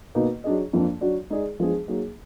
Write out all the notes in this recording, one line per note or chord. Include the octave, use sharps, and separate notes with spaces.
B2 A#3 D#4 F#4 B4
F#3 D4 G#4 D#5
F2 F3 A#3 D4
F#3 D4 F#4 D5
G#3 D#4 G#4 D5
F3 G#3 B3 D4 G#4
F#3 A#3 D#4 G#4